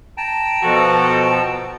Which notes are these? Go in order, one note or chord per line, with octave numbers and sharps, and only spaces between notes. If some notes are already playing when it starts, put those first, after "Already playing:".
G5 A5 A#5
B2 F3 F#4 A4